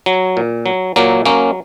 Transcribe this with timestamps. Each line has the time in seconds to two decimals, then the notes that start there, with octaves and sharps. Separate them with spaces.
0.06 F#3
0.37 A#2
0.66 F#3
0.96 A#2 F#3 A#3
1.25 F#3 A#3 C#4